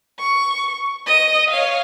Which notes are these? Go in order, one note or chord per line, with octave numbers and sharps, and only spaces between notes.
C#6
D#5 D#7
C#5 F5